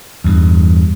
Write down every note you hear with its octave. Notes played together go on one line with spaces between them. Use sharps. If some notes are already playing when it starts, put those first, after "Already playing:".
E2 G2